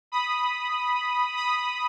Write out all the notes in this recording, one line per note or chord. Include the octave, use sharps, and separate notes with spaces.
B5 D#6
B5 D#6